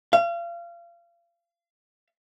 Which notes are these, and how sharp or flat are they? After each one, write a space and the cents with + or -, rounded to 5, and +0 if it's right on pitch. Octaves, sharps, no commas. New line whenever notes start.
F5 -30